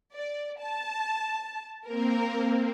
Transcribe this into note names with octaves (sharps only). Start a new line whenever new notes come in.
D5
A5
A#3 C4 A#4